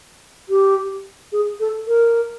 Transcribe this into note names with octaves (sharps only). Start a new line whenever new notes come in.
G4
G#4
A4
A#4